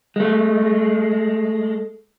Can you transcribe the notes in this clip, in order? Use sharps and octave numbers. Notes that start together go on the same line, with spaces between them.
G#3 A3